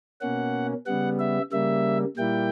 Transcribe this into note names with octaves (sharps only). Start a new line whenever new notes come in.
B2 A#3 C#4 F#5
C#3 G3 B3 F#5
E5
C#3 G3 A#3 E5
A#2 G3 A#3 E4 G5